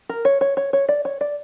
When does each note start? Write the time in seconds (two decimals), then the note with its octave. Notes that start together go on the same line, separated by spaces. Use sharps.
0.09 A#4
0.25 C#5
0.41 C#5
0.57 C#5
0.73 C#5
0.89 D5
1.05 C#5
1.21 D5